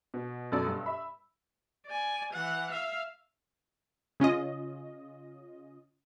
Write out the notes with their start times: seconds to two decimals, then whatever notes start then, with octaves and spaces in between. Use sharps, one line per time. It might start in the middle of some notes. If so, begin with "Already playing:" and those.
0.14 B2
0.52 F#2 B2 A4 D5 E6
0.66 G2
0.86 E5 B5
1.87 D5 G#5
2.33 E3 F#5
2.71 E5 F5
4.20 C#3 C#4 F4 D#5